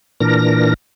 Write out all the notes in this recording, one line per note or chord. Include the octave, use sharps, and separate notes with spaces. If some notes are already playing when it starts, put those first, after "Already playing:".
A#2 E3 D4 A#4 A#6